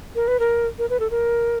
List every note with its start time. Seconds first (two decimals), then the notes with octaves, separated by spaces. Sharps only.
0.15 A#4
0.28 B4
0.40 A#4
0.79 A#4
0.90 B4
1.00 A4
1.11 A#4